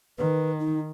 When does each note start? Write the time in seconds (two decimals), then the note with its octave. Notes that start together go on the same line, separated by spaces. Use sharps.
0.18 D#3 B4
0.60 D#4